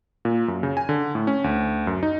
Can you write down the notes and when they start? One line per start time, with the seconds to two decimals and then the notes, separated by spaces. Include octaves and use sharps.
0.25 A#2
0.48 F#2
0.63 C#3
0.77 G#5
0.89 D3
1.15 A2
1.27 C#4
1.44 D2
1.87 F#2
2.03 D#4